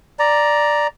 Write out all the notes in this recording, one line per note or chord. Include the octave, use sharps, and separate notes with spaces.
D5 A#5